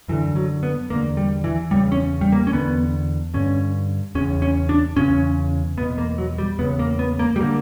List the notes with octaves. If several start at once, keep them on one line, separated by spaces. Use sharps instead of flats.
F#2 D3 E3
F#3
B3
E2 D3 A#3
G3
E3
E2 C#3 G3
C#4
G3
A#3
C#4
E2 D3 B3
G2 D3 C#4
E2 C#3 C#4
C#4
D4
E2 C#3 C#4
E2 B2 B3
A#3
F#3
G3
E2 C#3 B3
A#3
B3
A#3
G3
D3 A#3